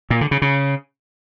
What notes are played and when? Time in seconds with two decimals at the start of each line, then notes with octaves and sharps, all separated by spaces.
0.10 A#2
0.21 D3
0.31 C#3
0.42 C#3